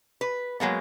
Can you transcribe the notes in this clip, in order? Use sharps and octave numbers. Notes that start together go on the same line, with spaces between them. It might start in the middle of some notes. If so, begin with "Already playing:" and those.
B4
F#3 G#3 A#3 B3